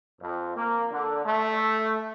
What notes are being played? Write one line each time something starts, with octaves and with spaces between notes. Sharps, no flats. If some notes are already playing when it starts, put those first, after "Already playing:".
F2
A#3
D3
A3